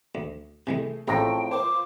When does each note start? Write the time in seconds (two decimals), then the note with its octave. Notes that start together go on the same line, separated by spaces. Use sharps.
0.15 D2
0.67 C3 E3 G#3 A3 G#4
1.08 A1 F2 A2 G#3 G5 A#5
1.51 F4 A#4 C5 D6